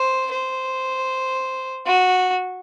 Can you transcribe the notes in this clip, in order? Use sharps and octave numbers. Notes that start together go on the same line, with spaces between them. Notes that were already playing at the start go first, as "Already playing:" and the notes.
Already playing: C5
C5
F#4